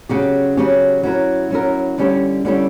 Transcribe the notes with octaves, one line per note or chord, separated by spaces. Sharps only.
C#3 F#3 C#4 G4
C#3 F#3 C#4 G4
F#3 C#4 E4 A#4
F#3 C#4 E4 A#4
D3 G3 C#4 E4 G4
D3 G3 C#4 E4 G4